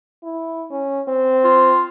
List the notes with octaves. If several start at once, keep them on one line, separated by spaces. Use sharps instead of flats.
E4
C#4
C4
F4